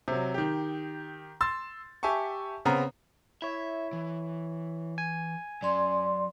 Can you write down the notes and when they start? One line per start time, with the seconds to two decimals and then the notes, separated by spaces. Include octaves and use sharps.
0.08 C3 F#3
0.34 D#3 G4
1.41 C6 E6 A6
2.03 G4 E5 G#5 A5 C#6
2.65 C#3 B3 C4 A#5
3.42 E4 C#5 E5
3.93 E3
4.98 G#5
5.62 F#3 C#4 D5 C6